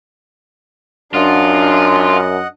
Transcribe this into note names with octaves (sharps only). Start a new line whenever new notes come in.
F#2 D4 F4 D#5 F#5